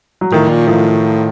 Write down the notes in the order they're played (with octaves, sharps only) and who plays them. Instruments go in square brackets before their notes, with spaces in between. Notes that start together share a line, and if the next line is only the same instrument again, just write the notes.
[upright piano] F#3
[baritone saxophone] A2 [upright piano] D#3 F3
[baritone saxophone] A#2
[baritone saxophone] A2 [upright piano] D#3 F3